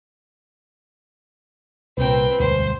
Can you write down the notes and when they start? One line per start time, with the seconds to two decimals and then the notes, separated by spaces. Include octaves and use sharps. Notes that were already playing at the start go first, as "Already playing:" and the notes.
1.98 C2 A#2 C4 B4 G5
2.40 E1 D2 G2 C5